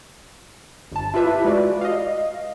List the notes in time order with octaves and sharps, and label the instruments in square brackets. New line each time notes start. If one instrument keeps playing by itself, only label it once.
[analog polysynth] G1 A5
E4 F4 G4 B4 E5
G#3 F#4 B4 D5
D#5 F5